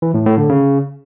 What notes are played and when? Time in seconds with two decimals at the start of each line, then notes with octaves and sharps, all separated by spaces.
0.02 E3
0.14 A2
0.26 A2
0.38 D3
0.49 C#3